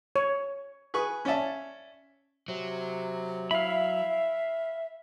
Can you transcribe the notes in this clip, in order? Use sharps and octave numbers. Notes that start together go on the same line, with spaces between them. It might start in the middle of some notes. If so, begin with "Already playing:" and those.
C#5
G#4 B4 C#6
C#4 C#5 D5 E5 A5
C3 F#3
E4 E5 F5 B5